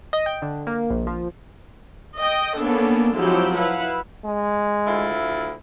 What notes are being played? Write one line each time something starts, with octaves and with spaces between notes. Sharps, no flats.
D#5
G5
D3
A#3
A#1
F3
D#5 G5
A#3 B3 C#4 D4 A4
F3 F#3 G#3 C4 E4 G4
E4 B4 F5 F#5
G#3
D2 E4 F4